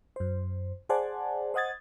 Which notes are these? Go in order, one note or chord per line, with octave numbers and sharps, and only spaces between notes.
F#2 C5
G#4 C5 D5 F#5 G#5 A5
C5 D#5 F#5 D#6 G#6 A6